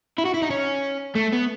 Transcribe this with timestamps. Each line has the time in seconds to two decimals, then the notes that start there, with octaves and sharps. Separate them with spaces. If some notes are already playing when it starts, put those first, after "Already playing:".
0.18 E4
0.25 F#4
0.34 E4
0.42 D#4
0.50 C#4
1.15 A3
1.32 B3